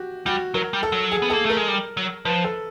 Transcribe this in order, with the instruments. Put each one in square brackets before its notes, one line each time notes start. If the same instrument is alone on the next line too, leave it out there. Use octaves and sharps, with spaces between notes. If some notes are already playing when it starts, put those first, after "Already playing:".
Already playing: [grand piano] F#4 G4
[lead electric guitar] G3 [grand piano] F#4
[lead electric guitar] F#3 [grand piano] A#4
[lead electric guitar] G3
[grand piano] A4
[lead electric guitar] F#3
[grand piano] G#4
[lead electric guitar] B3
[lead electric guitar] A#3 [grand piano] A4
[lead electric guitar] A3 [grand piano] A#4
[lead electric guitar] G#3
G3
F#3
[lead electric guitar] F3 [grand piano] B4
[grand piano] A4